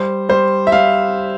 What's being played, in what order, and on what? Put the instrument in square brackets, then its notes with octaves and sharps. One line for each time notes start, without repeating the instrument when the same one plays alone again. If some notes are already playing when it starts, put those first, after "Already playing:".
Already playing: [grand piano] G3 C5
G3 C5
E5
G3 F5